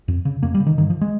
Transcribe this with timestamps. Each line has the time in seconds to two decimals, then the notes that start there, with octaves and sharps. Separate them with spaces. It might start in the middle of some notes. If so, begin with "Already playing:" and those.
0.08 F2
0.25 C#3
0.43 F2 A#3
0.54 G3
0.60 C#3
0.66 D#3
0.78 G2 D#3
0.90 F3
1.01 G#3